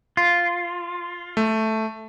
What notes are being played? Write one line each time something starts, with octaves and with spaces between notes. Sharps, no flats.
F4
A3